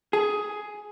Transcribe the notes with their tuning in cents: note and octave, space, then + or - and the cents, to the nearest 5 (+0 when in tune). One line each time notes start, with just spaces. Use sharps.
G#4 +10